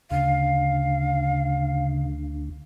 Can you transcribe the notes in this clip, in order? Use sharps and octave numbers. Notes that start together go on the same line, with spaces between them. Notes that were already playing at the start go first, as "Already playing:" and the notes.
D2 C#3 F5